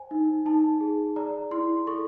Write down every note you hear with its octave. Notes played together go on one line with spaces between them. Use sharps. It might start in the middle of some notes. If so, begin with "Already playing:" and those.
Already playing: C5 G#5
D#4
D#4 A5
G#4
D5 A#5
E4 C6
A4 C#6